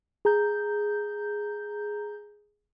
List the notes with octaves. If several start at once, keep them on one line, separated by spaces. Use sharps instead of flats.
G#4 A#5 G6